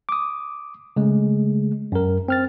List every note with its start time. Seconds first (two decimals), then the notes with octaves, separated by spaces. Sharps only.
0.09 D6 D#6
0.96 C#3 G#3 A3
1.92 F#2 A#4
2.28 C4 F6 A6